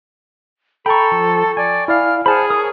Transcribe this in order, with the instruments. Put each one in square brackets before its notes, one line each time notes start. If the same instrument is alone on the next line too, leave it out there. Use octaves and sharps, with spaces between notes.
[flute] A4 [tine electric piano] G5 C#6 [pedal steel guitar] A#5 B5
[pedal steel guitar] F3
[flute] D5 [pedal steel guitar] G#5
[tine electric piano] E4 D5 F5 [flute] F6
[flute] G#4 [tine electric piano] C5 F6 [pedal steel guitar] F#5 A5 B5
[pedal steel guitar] A#4 C#5 [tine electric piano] D#6